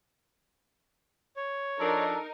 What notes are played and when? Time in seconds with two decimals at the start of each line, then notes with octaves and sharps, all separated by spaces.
1.37 C#5
1.80 F3 D4 D#4 A4 A#4